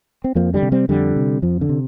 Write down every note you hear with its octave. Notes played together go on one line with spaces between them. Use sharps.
C4
F2 F3 A#3
D3 G3
C3
G3 C4
F2 D3 G3
C3
F2 F3
D3
C3